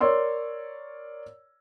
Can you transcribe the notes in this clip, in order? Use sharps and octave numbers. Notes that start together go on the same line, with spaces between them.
A#4 C#5 D5 C6 E6